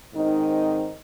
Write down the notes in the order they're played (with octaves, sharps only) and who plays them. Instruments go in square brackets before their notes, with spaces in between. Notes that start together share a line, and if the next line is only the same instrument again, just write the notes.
[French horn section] G#2 D#3 C4 D#4